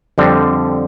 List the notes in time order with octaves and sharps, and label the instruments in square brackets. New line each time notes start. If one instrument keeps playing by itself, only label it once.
[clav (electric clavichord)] F2 D3 G3 C4